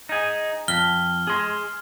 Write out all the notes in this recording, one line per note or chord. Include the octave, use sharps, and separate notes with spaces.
D#4 G#4
F2 F6 G7
G#4 C6